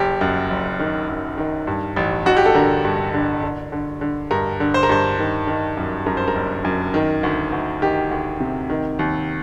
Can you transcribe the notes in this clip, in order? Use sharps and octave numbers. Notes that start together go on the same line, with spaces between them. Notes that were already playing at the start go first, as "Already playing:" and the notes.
Already playing: F#1 G4
F#2
F#1
D#3
F#2
D#3
G2
A1
A1 F#4
G4
A4
D3 A#4
G2
D3
D3
D3
D3
G2 A#4
D3
C5
A#4
G2 C5
D#3
D#3
F#2
F#2 A#4
C5
A#4
F#1
F#2
D#3
D2
D2
D#3 G4
D2
C3
D#3
D#2